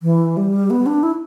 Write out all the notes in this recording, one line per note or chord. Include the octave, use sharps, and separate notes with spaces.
E3
G3
B3
D4
E4